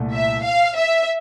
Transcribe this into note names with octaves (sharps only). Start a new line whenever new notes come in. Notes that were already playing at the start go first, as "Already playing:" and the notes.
Already playing: C2 A#2 A3
E5
F5
E5